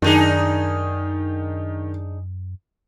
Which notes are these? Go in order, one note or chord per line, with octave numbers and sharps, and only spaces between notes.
F#2 D#3 D4 D#4 G#4